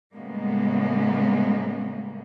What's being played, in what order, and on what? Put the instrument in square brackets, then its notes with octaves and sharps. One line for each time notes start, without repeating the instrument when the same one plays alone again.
[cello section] A2 C#3 G3 G#3 A#3 B3